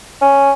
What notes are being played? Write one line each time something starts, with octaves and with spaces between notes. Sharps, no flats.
C#4